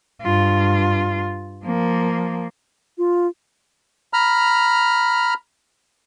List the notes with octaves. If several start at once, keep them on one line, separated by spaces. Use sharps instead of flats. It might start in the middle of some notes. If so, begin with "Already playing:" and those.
G2 F4
F3 A#3
F4
A#5 B5 F6